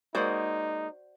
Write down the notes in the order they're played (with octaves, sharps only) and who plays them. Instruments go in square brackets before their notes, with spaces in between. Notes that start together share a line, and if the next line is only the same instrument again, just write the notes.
[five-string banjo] G#3 A#3 [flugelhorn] D#4 [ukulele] F#4 C5 D5